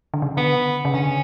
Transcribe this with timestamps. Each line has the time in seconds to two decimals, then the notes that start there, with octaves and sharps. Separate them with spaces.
0.14 D3
0.22 C#3
0.37 D3 B3
0.85 C#3
0.94 D3 C#4